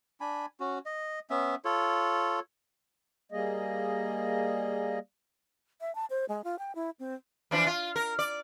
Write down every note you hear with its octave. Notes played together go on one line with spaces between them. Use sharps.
D4 G#5 B5
C#4 F#4
D#5
B3 C#4 E5
F4 A4 C#5
G3 A#3 G#4 D#5
E5
A5
C5
G#3
F4
G5
E4
C4
E3 F3 D4
F4
A#4
D5